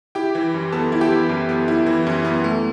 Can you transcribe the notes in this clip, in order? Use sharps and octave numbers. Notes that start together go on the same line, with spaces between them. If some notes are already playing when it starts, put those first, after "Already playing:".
E4 G4 G5
E3
F#2
B3 A4 A5
E4
G4 G5
E3
F#2
B3
E4
E3
F#2
B3
A3